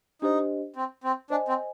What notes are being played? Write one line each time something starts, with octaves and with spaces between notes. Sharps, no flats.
D4 D#4 G4 C5 D#5
C4
C4
D4 C5 D#5 G#5
C4